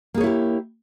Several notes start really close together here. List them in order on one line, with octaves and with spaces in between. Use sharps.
A#3 G#4 C#5 E4 G4